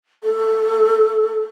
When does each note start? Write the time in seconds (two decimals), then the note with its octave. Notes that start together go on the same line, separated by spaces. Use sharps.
0.24 A4